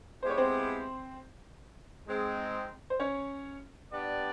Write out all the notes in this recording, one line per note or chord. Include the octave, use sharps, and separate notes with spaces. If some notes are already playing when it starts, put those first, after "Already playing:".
G#3 B3 E4 G4 C5
C#5
C4 C5
G#3 C4 D#4
C5
C#4 C#5
B3 D4 G4 B4 D5